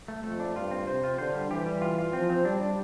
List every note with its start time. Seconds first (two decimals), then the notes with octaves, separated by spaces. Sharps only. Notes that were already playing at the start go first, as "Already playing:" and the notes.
0.08 A3
0.24 F2 A3
0.40 D4
0.56 G2 F4
0.71 C4
0.87 C3 C5
1.04 F4
1.18 D3 C5
1.35 G3
1.51 E3 G4
1.66 G3
1.82 F4
1.99 F4
2.13 F3 C4
2.30 C4
2.45 G3 D4
2.61 D4